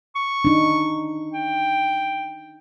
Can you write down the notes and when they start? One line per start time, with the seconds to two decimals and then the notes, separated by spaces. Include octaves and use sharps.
0.16 C#6
0.45 D4 D#4
1.33 G5